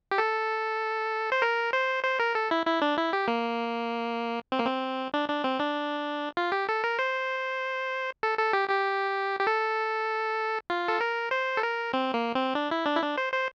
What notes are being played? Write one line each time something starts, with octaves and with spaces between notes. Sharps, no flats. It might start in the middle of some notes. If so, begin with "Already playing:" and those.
G4
A4
C5
A#4
C5
C5
A#4
A4
E4
E4
D4
E4
G4
A#3
C4
A#3
C4
D4
D4
C4
D4
F4
G4
A4
A#4
C5
A4
A4
G4
G4
G4
A4
F4
A4
A#4
C5
A4
A#4
C4
A#3
C4
D4
E4
D4
E4
D4
C5
C5